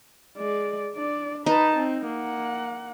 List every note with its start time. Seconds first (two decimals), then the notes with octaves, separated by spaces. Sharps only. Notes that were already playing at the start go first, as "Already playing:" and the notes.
0.37 G#3 D5
0.94 D4 D5
1.46 D#4 B4 A5
1.76 C4
2.06 A#3 F#5